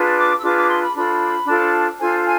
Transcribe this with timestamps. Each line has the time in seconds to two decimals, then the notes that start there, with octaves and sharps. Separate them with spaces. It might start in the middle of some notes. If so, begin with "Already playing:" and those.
Already playing: D4 F4 G#4 B4
0.16 D6
0.36 E6
0.42 D4 F4 G#4 B4 D6
0.55 D6
0.68 C6
0.81 B5
0.94 D4 F4 A4 C5 B5
1.46 D4 F4 A4 C5
1.97 D4 F4 A4 C5 G#5
2.23 G#5